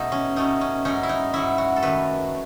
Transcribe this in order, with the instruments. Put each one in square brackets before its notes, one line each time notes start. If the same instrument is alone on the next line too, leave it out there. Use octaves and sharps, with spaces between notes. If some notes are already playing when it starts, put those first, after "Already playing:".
Already playing: [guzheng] B2 A3 D#4
C#4
B2 A3 C#4 D#4
C#4
G#2 F#3 C#4 D#4
E4
D#4
G#2 F#3 C#4 E4
F#4
A4
F#2 D#3 A3 B4